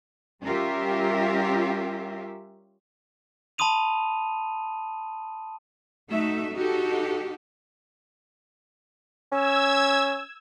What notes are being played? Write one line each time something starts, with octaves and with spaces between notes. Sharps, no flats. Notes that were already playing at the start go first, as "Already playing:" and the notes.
G3 C#4 F4 G4 A#4 E5
A5 B5 C6 D#6 D#7 F7
A3 D#4 F#4 E5
D#4 F#4 G4 A4
C#4 E6 G#6